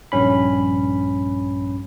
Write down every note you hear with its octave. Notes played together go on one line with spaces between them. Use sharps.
A#1 G2 C#4 B5